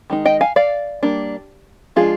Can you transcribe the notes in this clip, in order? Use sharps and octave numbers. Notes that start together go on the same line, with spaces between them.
D#3 G#3 D#4
D#5 G5
F5 G#5
D5 F5
G3 A#3 D4
F3 G#3 D4 F4 G#4